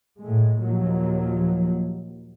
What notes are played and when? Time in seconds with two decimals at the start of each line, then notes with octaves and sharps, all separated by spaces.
0.20 A2 G#3
0.60 D#2 A#2 F3 F#3